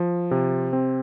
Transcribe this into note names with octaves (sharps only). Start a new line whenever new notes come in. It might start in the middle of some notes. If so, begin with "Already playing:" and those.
Already playing: F3
C3
C4